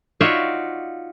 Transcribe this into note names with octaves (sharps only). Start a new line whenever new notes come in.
D#4 F4 F#4 C#5 D5 E5